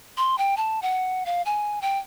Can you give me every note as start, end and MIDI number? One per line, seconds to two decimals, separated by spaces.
0.17 0.36 84
0.38 0.55 79
0.57 0.80 81
0.82 1.24 78
1.26 1.42 77
1.46 1.82 80
1.82 1.98 79